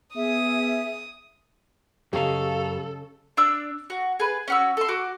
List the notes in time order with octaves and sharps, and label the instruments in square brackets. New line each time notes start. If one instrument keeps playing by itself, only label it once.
[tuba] B3 [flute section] G#4 E5 [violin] D#6
[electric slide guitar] F#2 F5 [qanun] C#3 C#5 D#5 [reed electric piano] G4 [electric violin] A4
[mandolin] D4 D5 E6
F#4
G#4 B4
C#4 F#4 E6
A4 C6
F#4 D6